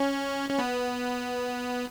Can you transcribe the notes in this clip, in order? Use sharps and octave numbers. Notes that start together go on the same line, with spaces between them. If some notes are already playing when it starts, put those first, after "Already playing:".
Already playing: C#4
C#4
B3